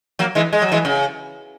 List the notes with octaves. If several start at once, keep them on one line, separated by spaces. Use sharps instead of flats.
F#3 A#3
E3 G#3
G#3
F#3
E3 G#3
C#3